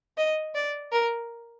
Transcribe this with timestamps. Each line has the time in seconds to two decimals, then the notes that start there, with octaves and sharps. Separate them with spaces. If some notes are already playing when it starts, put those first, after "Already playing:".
0.17 D#5
0.55 D5
0.92 A#4